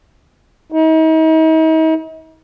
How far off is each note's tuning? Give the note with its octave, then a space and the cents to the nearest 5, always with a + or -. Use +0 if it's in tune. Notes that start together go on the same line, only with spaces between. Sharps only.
D#4 +40